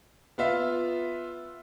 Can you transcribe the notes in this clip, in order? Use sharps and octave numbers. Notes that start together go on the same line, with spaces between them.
B3 F4 E5 F5